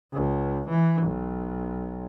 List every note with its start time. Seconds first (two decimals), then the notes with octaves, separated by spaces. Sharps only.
0.13 C#2
0.70 E3
1.03 B1